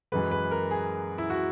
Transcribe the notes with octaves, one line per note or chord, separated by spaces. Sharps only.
F#2 E3 G#3 B4
B4
A#4
G#4
E4
F#4